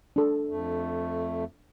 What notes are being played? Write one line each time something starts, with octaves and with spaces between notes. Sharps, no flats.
D4 A4
F2 A3